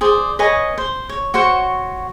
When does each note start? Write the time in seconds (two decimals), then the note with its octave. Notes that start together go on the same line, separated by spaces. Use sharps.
0.01 G#4 C5 D5
0.39 B4 C#5 D#5 G#5
0.78 C5
1.09 C#5
1.34 F#4 C5 C#5 F#5